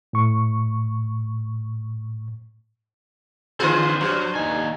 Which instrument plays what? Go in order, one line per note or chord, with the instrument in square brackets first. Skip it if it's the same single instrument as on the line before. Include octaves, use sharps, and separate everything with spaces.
[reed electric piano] A2 C#6
[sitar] D3 F4 G#4 [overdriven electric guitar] C4 B4 [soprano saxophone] C5
[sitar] G2 [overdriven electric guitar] F#3
[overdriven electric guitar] D#2 G#5 [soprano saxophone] D#4